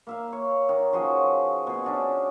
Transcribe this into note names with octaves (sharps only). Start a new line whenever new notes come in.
A#3 E5 F5
C#5
D#3
C#3 F3 F#4 D#5
B2 G#4
C#4 D4 F#4